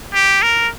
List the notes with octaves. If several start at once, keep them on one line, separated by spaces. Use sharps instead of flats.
G4
A#4